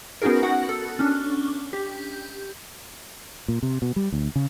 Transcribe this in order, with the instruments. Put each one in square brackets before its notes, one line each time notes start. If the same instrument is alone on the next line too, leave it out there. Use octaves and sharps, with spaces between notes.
[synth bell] B3 C#4 D#4 F#4 G#4 A#4
F#4 F#5
A4
C#4 D4
G4
[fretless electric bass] A#2
C3
B2
G3
D2
C#3